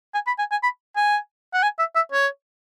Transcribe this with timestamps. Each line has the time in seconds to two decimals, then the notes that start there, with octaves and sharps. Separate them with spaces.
0.14 G#5
0.27 B5
0.39 G#5
0.51 G#5
0.63 B5
0.96 G#5
1.54 F#5
1.63 G#5
1.79 E5
1.95 E5
2.12 C#5